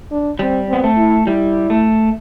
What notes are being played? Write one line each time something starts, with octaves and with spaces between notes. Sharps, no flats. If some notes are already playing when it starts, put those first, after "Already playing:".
D4
G3 C4
B3 C4
A3
E4
G3 E4
A3